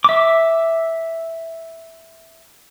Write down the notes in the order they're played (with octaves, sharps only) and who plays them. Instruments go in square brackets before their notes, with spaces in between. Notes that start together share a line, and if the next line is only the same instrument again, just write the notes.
[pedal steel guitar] E5 D6